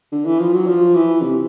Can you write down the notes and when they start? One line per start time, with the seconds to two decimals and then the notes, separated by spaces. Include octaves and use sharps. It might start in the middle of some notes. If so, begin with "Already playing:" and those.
0.12 D3
0.26 E3
0.40 F3
0.53 F#3
0.67 F3
0.95 E3
1.22 C3